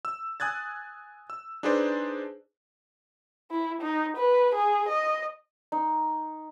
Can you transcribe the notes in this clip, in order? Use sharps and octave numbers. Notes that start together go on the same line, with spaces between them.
E6
G#5 D#6 F#6 G#6 A6
E6
D4 D#4 G#4 B4 C5 D5
E4
D#4
B4
G#4
D#5
D#4